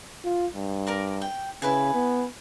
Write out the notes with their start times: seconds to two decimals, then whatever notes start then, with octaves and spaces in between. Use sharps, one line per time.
0.24 F4
0.54 G2
0.87 A#4 D5 A#5
1.22 G5
1.62 C#3 E4 B4 G#5
1.94 B3